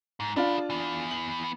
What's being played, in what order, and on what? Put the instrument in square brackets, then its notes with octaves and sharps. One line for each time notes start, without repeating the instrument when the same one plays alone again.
[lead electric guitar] G#2
[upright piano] D4 F4 [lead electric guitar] G#4 B5
[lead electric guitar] E3 B3
[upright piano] F#7